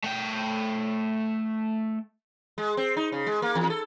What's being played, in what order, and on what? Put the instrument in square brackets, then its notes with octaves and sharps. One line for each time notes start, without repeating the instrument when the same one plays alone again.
[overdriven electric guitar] A3 G5
[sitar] G#3
C4
D#4
C#3
G#3
A#3
E2
A4